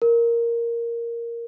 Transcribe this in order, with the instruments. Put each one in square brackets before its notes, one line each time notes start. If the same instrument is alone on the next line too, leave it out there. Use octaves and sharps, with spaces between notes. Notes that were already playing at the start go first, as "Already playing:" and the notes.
[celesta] A#4